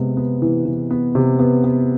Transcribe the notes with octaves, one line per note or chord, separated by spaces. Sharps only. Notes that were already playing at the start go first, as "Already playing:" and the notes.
Already playing: C3 G#3 B3
B3
E3
E3
B3
C3
B3
B3